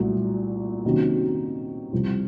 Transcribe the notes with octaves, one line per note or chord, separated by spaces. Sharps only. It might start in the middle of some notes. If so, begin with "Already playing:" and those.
Already playing: C2 A#2 F#3 A3
C3 D#3 F#3 A#3 C#4
C2 C3 F3